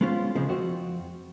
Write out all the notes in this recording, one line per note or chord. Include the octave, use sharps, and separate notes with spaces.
G#3 B3 C#4 F4 C5
C#3 F3 G#3 C4
F2 C4 F#4